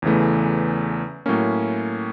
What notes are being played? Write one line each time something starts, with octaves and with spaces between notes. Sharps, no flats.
E2 C#3 E3 A3
A2 F#3 A#3 C#4